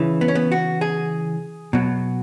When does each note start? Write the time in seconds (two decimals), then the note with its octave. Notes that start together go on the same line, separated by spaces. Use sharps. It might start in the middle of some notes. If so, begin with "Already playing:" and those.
Already playing: C#3 E3
0.21 B3
0.28 C#4
0.35 B3
0.52 F#4
0.81 G#4
1.73 B2 F#3